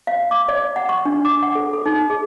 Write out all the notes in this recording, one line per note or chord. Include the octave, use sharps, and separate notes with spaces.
F5
D6
D5
F#5
C#6
D4
D6
F#5
A4
A4
D#4
G#4